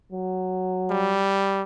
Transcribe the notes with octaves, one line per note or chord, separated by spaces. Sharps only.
F#3
G3